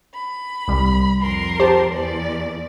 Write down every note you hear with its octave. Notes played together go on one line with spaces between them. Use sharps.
B5
C2 G3
F2 A#4 C6
G4 C5 A5
E2 D5